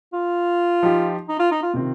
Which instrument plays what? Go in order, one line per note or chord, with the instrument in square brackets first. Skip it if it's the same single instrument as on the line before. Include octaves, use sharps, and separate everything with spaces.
[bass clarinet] F4
[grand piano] F3 D#4 G4
[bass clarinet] D#4
F4
D#4
F4
[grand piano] C3 D#3 C4 F4